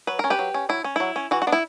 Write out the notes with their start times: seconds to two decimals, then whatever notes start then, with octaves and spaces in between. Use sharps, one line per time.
0.07 F#3 B4
0.19 C#4 A#4
0.30 G4 B4
0.39 F#3
0.54 C#4
0.69 F#3 E4
0.84 C#4
0.96 F#3 E4
1.16 C#4
1.31 E3 F#4
1.42 F#4
1.47 B3 D4
1.52 E4